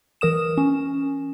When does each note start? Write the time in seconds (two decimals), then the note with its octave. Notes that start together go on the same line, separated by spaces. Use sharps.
0.21 E3 A#4 D#6 E7
0.58 C#4